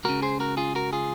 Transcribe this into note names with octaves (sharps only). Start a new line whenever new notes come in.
C#2 C#3 F#4 A#4
G#4 C5
F#4 A#4
F4 G#4
F#4 A#4
F4 G#4